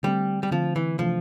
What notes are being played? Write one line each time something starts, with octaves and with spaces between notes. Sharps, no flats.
D3 G3 A3 C4
G3
D3 F3 A3 C4
E3
C3 E3 F3 A3 D4